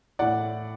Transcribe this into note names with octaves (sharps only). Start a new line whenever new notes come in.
A2 E3 D5 F#5